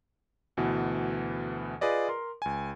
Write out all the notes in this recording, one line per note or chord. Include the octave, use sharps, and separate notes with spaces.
D2 B2 E3
F4 G#4 B4 D5 D#5
A#4 C6
C#2 G#5